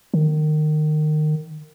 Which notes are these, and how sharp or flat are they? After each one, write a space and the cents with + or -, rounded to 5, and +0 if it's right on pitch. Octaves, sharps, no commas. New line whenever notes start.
D#3 -25